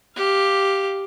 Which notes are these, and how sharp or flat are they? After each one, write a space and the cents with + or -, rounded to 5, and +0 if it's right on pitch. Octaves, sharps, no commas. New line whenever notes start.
G4 +0 F5 +0